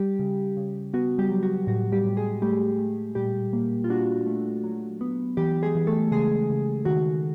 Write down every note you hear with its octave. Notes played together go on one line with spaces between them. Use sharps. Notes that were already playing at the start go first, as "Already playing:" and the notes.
Already playing: G3 G4
C#3
C#3
B3 F#4
G3 G4
F#3
F#4
A2 F#4
G3 G4
A2
G#3 G#4
G3 A3 G4
A3
A#2 G3 G4
A#3
F4
D4 F#4
A3
F#3
B3
E3 G3 G4
G#3 G#4
E3
A3 A4
C#3 G#3 G#4
C#3
D#3 F#4